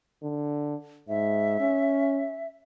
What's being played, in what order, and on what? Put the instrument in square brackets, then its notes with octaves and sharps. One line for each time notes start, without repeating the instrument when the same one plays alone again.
[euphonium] D3
[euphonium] G#2 [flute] E5
[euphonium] C#4